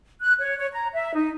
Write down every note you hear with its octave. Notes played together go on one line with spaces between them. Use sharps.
F#6
C#5
C#5
A#5
E5
D#4